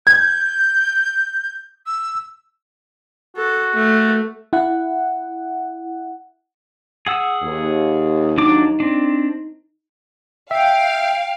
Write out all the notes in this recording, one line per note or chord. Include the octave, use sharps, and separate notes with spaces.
G6 G#6
E6
F#4 A4
A3
E4 F#5
G#4 F#5 E6
D#2
F#3 D4 D#4 D6
C4 D4
E5 F5 G5